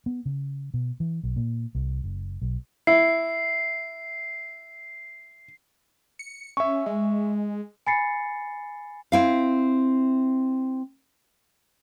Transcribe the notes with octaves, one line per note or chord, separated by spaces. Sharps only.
B3
C#3
B2
E3
B1
A#2
C2
F#1
B1
E4 C7
C#7
C#4 E5 C#6
G#3
G#5 B5 A6 C7 C#7
C4 E4 F5